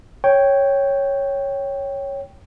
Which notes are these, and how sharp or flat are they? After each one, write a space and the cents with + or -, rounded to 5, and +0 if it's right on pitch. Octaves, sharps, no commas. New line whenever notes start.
C#5 +0 G5 +0